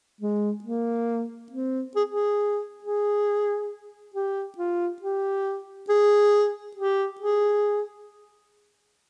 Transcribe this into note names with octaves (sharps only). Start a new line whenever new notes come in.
G#3
A#3
C4
G#4
G#4
G#4
G4
F4
G4
G#4
G4
G#4